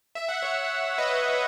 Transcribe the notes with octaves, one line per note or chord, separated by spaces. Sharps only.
E5
F#5
C#5 E5
B4 D#5